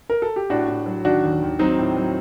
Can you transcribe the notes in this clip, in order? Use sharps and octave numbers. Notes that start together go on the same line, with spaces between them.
A#4
A4
G4
A2 D4 F#4
A2
F#3
D#3 D4 F#4
D#2
D#2
F#3 C4 D#4
A2
F#3